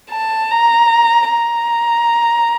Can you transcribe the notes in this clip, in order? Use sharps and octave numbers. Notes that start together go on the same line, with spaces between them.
A5
A#5
A#5